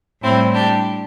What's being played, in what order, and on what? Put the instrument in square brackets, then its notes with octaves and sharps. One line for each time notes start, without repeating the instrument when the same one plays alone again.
[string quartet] A2 G3 C4 E4
D4 G4